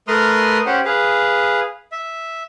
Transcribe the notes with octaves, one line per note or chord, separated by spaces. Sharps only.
A3 A#4 B4 C6 D#6 F6
C#4 G4 C5 F#5
G#4 B4 F5
E5